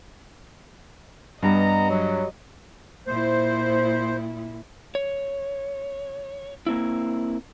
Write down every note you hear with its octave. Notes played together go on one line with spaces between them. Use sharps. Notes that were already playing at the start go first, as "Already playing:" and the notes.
G2 G3 B3 D#5 A#5
F#3
A#2 E4 C5
C#5
A#3 C4 E4